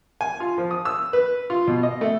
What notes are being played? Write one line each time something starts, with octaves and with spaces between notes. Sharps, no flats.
G#5
F4
F3
D#6
E6
B4
F4
B2
D#5
A3